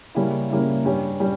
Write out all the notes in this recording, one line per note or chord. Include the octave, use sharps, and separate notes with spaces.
C#3 G3 A#3 C#4 E4
C#3 G3 A#3 C#4 E4
G2 G3 C#4
G3 C#4